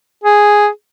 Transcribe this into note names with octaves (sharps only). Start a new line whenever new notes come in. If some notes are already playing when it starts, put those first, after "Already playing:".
G#4